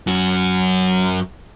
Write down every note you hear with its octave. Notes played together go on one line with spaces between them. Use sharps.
F#2 F#4